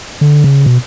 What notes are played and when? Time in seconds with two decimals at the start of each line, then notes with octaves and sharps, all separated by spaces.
0.21 D3
0.44 C#3
0.66 B2